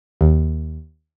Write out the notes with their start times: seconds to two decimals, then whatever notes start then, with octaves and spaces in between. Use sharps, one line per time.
0.21 D#2